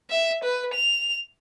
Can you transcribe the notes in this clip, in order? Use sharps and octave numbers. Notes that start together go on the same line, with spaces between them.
E5
B4
F7